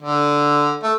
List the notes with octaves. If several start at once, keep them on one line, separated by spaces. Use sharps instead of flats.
D3
A3